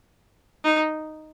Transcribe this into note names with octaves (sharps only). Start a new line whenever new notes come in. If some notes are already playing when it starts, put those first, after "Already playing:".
D#4